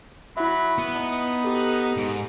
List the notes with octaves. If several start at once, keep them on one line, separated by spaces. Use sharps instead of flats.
F#3 E4 E5 B5
B3
D#4
G4 A4
G#2